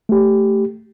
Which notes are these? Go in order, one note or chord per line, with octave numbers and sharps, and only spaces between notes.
A3 G4